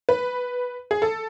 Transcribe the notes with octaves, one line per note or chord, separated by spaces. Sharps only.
B4
G#4
A4